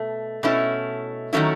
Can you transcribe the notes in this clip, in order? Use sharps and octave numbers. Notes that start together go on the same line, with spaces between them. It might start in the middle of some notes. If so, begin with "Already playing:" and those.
Already playing: B2 A3
B2 A3 C#4 E4
D#3 F#3 A3 C#4 E4